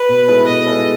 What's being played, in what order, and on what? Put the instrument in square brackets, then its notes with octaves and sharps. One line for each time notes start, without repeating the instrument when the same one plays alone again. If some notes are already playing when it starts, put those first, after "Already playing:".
Already playing: [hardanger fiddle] B4
[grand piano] B2
G#3 B3 E4 A4
[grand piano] B2 [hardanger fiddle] D#5
[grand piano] G#3 B3 E4 A4